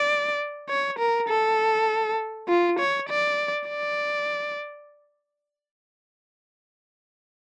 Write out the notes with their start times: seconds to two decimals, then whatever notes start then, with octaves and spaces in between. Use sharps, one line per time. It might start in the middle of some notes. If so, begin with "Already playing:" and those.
Already playing: D5
0.70 C#5
0.99 A#4
1.28 A4
2.48 F4
2.79 C#5
3.09 D5
3.69 D5